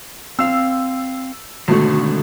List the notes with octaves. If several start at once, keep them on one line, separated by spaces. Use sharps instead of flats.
C4 F5 E6
G#1 B2 D3 D#3 A3